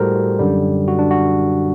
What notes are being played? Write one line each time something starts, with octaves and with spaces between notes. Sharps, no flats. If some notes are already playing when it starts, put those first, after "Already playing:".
Already playing: A2 G3 F#4 G4 A4 A#4 C5
F#2 D3 G3
F#4
D4
F#4